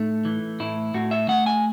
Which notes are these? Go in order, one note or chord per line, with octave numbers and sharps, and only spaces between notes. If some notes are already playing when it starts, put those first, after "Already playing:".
Already playing: A2 A3 D#4
E3
A2 E4
A2 F#4
E5
A3 F#5
G#5